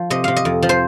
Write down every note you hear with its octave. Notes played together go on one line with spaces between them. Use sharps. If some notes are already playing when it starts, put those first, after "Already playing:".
Already playing: F3
C3 D#5
C3 F5
D#5
F2
F3
C5